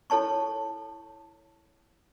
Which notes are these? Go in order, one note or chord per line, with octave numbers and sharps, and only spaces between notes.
E4 A4 C#5 A5 C#6